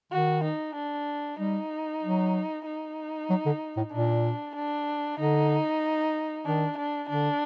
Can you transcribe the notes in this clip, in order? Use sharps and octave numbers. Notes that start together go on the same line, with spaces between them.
D#3 F#4
D#4
D4
G3 D#4
F#3
D#4
F#3
D3
A2
A#2 D4
D4
D3 D#4
D#3 D4
D4
D3 D4